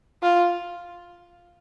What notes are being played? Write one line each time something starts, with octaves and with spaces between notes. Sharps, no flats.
F4